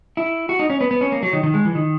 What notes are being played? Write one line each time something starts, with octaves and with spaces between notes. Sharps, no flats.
E4
F#4
D#4
C#4
B3
B3
C#4
A#3
F#3
D#3
D#3
G#3
E3
D#3